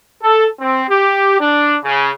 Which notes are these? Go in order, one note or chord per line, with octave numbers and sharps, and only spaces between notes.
A4
C4
G4
D4
C#3